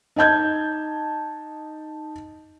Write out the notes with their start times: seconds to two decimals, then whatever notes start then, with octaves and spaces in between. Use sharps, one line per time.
0.16 D#4 D#5 A5 G6 G#6